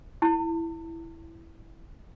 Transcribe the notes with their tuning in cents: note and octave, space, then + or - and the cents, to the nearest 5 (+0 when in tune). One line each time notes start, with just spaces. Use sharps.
E4 +0 A5 +40 C6 +45